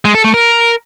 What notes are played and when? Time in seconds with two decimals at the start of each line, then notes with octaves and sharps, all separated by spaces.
0.05 G#3
0.14 A4
0.24 A3
0.34 A#4